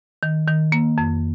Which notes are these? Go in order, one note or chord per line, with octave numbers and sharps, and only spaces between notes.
D#3
D#3
A#3
F2